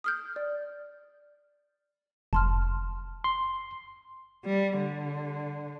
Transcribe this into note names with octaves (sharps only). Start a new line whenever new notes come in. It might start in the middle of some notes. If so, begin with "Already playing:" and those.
D#6 F6 G6
D5
F1 A5 C6 F6
C6
G3
D3